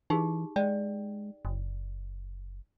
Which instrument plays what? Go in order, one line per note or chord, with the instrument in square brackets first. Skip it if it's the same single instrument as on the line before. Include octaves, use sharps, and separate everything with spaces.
[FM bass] E3 [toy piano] D#4 G4 G#4
[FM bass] G#3 [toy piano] D5 G5
[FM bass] F#1